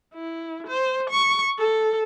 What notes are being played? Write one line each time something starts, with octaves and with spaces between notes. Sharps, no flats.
E4
C5
C#6
A4